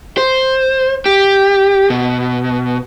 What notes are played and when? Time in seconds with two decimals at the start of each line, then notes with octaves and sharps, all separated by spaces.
0.18 C5
1.06 G4
1.90 B2